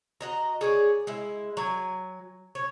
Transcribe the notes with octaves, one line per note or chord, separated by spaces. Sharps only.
F#4 D#5 A#5
G#4 C#5 D5
G#3 E4
F#3 G#5
C#5